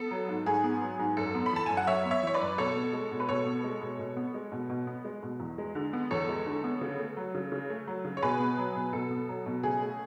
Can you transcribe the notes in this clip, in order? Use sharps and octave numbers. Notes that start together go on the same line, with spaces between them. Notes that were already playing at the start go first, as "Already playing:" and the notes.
Already playing: B3 A4
F#3
G#2
G#2 G#4
B3
F#3
G#2
F#2 A4
B3
B5
E3 A5
F#2 G#5
F#5
F#2 C#5 E5
B3
C#5 E5
E3 C#5
B4 D5
F#2
B2 A4 C#5
B3
G#3
B2
B4
B2 A4 C#5
B3
G#3
B2
B2
B3
G#3
B2
B2
B3
G#3
B2
E2
G#3
D3
B3
E2 A4 C#5
G#3
D3
B3
C#3
A3
F#3
C#3
C#3
A3
F#3
C#3
C#5
B2 G#4 B4
B3
F#3
B2
B2 A4
B3
F#3
B2
C#3 G#4
A3